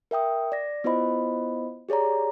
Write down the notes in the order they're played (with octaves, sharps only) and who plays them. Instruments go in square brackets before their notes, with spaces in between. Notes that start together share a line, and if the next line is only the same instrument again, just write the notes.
[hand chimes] A#4 E5 G5 D#6
D5 A#6
B3 E4 F4 C5 D#5 B5
G4 G#4 C#5 D5 A#5